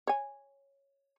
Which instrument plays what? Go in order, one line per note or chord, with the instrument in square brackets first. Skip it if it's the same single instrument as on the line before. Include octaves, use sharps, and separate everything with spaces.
[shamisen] C#5 G#5